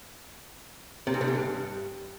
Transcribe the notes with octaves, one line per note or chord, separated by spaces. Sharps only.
C3
G#2
D3
G#2
G2